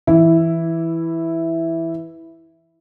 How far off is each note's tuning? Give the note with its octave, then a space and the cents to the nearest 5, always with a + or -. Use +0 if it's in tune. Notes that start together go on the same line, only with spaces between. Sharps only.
E3 +0 E4 +0